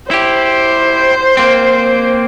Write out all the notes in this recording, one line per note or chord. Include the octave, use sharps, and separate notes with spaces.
E4 G4 C5
A#3 C4